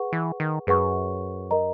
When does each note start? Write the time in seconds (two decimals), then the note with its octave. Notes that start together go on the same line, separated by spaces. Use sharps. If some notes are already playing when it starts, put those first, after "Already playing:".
Already playing: G#4 B4 F#5 C#6
0.12 E3
0.40 D#3
0.67 F#2 G#4 B4 F#5 C#6
1.51 A#4 D#5 A#5